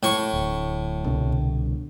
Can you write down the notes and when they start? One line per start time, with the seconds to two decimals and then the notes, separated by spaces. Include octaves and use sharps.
0.03 A2 C#6
0.34 D1
1.05 C2 B2 D3